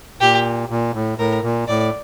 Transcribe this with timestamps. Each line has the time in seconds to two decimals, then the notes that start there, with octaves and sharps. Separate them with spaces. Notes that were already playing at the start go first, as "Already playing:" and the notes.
0.21 A#2 G4
0.70 A#2
0.94 A2
1.18 A2 A#4
1.42 A#2
1.68 A2 D5